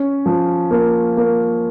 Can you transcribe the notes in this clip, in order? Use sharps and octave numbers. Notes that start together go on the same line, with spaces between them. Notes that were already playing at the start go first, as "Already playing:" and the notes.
Already playing: C#4
F3
A#3
A#3